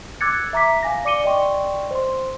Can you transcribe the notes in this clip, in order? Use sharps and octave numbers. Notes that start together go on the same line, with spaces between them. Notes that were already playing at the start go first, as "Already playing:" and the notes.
D6 E6 F#6 G#6 A6 C#7
E5 A#5 D6 B6
F5 G#5 A#6
D5 D6 C#7 D#7 G7
D5 D#5 G5 C6 C#6
C5 C6